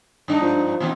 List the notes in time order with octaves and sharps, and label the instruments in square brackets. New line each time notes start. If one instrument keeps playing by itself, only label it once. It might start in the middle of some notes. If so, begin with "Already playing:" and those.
[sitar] G2 D4 D#4
[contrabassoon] F3
[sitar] A#2 E3 C4